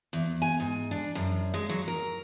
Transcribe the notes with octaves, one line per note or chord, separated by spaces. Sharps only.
E2
G#5
G#2
D4
F#2
G#3
F#3
A#4